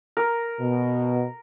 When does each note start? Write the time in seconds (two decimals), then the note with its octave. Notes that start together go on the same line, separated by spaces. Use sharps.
0.17 A#4
0.61 B2